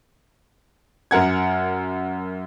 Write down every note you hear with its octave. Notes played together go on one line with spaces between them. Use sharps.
F#2 A#4 F#5 G#6